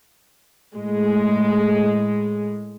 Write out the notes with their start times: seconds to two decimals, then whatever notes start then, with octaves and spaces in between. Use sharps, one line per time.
0.75 A2 G#3